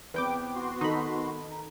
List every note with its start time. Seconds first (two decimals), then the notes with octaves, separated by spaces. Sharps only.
0.14 E2 B3 C4 B4 G5 D6
0.55 F#4 C6
0.81 D#3 D#4 A4 B5
1.51 A#5